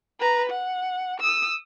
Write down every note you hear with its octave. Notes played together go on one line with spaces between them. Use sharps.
B4 A#5
F#5
D#6 E6